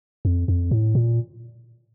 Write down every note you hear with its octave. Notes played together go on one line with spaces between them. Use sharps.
F2
F2
A2
A#2